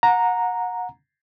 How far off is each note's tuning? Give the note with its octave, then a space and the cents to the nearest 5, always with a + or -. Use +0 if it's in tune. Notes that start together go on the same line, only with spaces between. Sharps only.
F#5 -25 A#5 +0